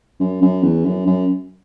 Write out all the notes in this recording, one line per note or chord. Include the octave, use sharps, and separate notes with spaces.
F#2
F#2
E2
F#2
F#2